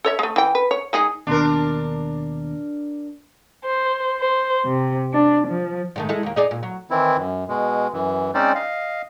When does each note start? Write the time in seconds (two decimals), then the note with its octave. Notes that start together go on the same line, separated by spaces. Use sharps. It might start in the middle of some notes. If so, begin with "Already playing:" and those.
0.05 A4 C#5 E5
0.19 G#3 A3
0.36 E3 G5
0.55 B4
0.71 C#5
0.93 G#3 D#4 G#4
1.27 D#2 B2 D4 A#4 C6
3.63 C5
4.19 C5
4.65 C3
5.13 D4
5.47 F3
5.96 G#2 D#3 A3
6.09 G#3 E4 A4
6.23 D#2 A#3
6.36 D#4 G#4 D5
6.51 A#2
6.63 F#3
6.91 D#3 E3 C4 E4
7.17 F#2
7.48 B2 G#3
7.93 F#2 E3
8.34 G#3 C4 C#4 D#4 C5 D5
8.55 D#5 F5